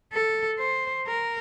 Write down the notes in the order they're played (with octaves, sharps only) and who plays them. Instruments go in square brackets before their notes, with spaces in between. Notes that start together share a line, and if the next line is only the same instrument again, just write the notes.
[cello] A4
C5
A#4